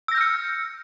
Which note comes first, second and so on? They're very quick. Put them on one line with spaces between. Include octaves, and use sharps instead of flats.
E6 A#6 G6 F6 C#7